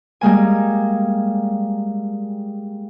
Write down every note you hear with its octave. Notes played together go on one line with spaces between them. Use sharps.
G3 G#3 A#3 G#5